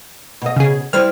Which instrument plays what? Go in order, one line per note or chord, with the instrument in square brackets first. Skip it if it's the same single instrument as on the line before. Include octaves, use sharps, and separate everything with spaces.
[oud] B2 D#5
[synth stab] C#3 G#4
[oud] G3 C4 E4 [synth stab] F6